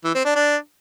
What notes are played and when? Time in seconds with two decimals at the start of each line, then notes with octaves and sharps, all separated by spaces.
0.04 E3
0.15 C4
0.25 D4
0.36 D4